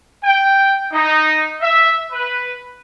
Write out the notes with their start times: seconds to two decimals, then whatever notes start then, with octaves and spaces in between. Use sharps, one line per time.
0.23 G5
0.93 D#4
1.61 E5
2.12 B4